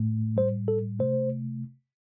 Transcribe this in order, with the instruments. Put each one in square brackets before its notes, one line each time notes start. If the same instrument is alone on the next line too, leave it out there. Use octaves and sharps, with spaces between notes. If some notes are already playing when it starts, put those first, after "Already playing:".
Already playing: [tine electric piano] A2 A3
A2 G3 C5
A4
C3 A3 C5